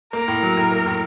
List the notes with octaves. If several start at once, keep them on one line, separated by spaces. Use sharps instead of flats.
A#3 A#4
A2
F#3
A2
A#3
A2